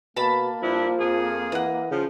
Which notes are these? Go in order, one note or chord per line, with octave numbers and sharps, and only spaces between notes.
B2 A#3 A5 B5
G2 F3 D4 E4
F2 G#4
E3 D#5 F#5
C#3 F3